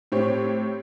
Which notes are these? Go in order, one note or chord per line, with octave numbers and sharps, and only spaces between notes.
A2 C4 G4 C#5